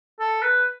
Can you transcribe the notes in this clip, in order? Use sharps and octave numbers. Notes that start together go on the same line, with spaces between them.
A4
B4